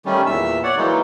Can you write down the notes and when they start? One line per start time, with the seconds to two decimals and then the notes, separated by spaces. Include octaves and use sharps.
0.06 D#3 G3 A3 C#4
0.26 E2 A#2 E5 E6
0.63 C#5 D5 F#5
0.77 E3 F#3 G#3 A#3 D#4